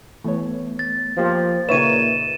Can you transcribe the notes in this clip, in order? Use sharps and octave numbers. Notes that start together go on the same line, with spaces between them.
E3 A3 B3 C#5
A6
F3 A#3 G4 C5
A#2 C#3 D#4 B4 C#5 E5 D#7 E7